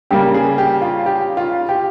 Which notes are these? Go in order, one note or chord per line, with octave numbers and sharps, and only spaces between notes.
C#3 G3 A#3 G4
G#4
G4
F4
G4
F4
G4